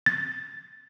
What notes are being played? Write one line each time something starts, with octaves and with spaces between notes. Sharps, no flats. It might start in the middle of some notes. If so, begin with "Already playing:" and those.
A6